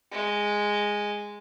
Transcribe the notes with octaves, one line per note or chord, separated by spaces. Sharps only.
G#3